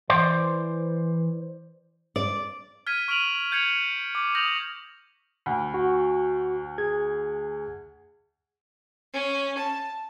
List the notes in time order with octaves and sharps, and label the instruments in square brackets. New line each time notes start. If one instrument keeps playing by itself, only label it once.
[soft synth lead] E3 [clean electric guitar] C5 D5 C6
[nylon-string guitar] D5
[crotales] F6 G#6 B6 D#7
C#6 F6 D7 D#7 F7 F#7
G6 G#6 C#7 F7 F#7
D6
D#6 G6 A#6 F7 F#7
[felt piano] D2 [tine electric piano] B5
[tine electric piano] F#4
G#4 G#6
[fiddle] C#4
A5